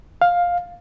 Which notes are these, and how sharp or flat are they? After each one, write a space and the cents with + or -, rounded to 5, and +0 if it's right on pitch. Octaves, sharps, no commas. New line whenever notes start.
F5 +10